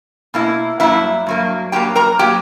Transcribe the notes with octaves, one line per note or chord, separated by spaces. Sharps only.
B2 A#3 E4
G2 F#3 A#3 E4 E5
G2 F#3 A#3
G2 F#3 A#3 G4 G5
A#4 A#5
F#3 A#3 G4 G5